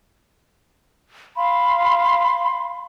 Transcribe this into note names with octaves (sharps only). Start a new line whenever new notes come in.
F5 B5 C6